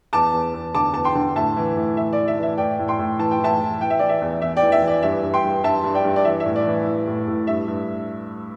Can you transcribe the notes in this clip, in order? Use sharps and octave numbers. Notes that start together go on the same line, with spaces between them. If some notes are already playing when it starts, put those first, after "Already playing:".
E2 A5 D6
E2
E2
D3 A5 D6
E2 A5
G5 C6
D3
A2 E5 A5
E3
A2
E3 E5
D5
E3
E5
E3 E5
A2 D5 G5
A2
G5 C6
A2
E3 A5
G5
E3 E5 A5
E3
E3 G5
E5
E3 D5
E5
E2
E2 E5
D5 G5
E3
E5
E3
D5
G2 E5
G2
G5 C6
G2
G2 E5 A5
G2
D5 G5
G2
D5
E3 E5
E5
A2
D5
E3
E3
A2
A2
G2 E5
G2